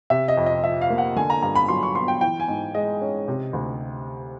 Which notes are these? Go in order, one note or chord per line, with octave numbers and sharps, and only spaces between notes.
C3 E5
D#5
F2
D#5
F3 E5
F5
A#3
F#5
D3 G#5
A#5
G2 A#5
B5
F#3 C6
C#6
B3 C6
G5
E3 G5
G#5
G#2
G#3 D#5
C#4
C3
D2